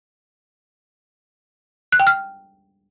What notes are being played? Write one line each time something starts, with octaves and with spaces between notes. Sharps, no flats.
F#6
G5
F6